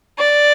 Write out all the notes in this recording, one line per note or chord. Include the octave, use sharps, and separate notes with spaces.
D5